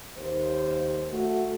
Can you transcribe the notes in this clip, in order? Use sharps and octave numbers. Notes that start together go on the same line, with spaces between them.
D#2 C5
A3 F#4